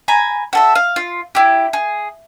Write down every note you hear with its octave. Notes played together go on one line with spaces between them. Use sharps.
G#5 A#5 B5
F#4 A4 E5
F5
F4
E4 G4
G#4